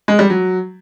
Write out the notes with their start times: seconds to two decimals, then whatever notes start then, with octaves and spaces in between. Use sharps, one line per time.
0.08 G#3
0.19 G3
0.30 F#3